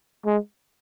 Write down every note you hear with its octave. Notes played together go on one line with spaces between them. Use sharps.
G#3